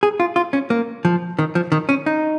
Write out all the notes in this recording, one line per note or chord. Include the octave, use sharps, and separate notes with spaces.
G#4
F4
F4
C#4
A#3
F3
D#3
F3
D#3
C#4
D#4